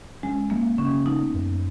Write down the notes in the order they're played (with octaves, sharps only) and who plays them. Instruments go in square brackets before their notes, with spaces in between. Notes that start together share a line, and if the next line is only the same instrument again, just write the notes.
[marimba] G#3 [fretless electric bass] C#4
[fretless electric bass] G#3 [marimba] A#3
[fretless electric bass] C#3 [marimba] C#4
[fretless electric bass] B3 [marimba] D#4
[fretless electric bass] F#2